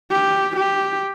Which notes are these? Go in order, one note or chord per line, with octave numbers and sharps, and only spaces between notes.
G4
G4